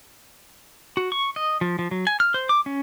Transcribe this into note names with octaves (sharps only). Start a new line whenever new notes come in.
F#4
C#6
D#5
F3
F3
F#3
G#5
F6
C5
D6
C#4